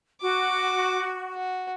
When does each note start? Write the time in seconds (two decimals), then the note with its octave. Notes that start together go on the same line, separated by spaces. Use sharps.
0.22 F#4 D6
1.34 F#4